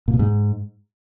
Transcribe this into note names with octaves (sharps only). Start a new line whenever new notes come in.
A#2
B2
G#2